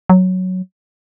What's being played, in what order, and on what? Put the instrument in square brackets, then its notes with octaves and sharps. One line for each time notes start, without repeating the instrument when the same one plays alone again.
[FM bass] F#3